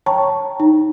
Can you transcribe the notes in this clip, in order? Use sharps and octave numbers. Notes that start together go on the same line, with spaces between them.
C#5 G5 A5 A#5 C#6
D#4